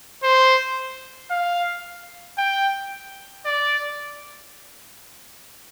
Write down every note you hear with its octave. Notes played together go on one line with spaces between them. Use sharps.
C5
F5
G5
D5